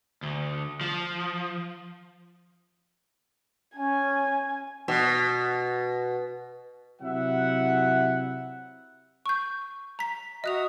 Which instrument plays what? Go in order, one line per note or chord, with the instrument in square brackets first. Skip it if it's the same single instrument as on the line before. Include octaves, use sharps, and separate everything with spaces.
[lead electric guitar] D2
F3
[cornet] C#4 [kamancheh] G#5
[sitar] B2
[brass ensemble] C3 F#3 E4 E5 F#5
[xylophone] C#6 G6
A#5 B6
[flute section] F#4 E5 D#6 [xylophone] D#5 F#6 F7